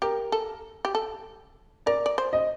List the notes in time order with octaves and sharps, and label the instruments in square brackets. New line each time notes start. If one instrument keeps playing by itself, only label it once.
[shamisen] G4 [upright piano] A#4
[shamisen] A4
G4
A4
[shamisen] A#4 [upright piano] D5
[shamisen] D5
C5
[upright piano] D#5